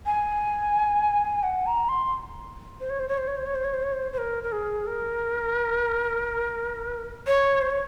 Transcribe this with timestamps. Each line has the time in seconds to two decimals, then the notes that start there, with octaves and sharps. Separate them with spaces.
0.06 G#5
1.43 F#5
1.66 A#5
1.89 C6
2.80 C5
2.90 C#5
3.00 C5
3.08 C#5
3.18 C5
3.27 C#5
3.37 C5
3.46 C#5
3.55 C5
3.64 C#5
3.74 C5
3.83 C#5
3.93 C5
4.13 C5
4.18 A#4
4.43 A#4
4.52 G#4
4.87 A#4
7.27 C#5
7.61 C5
7.70 C#5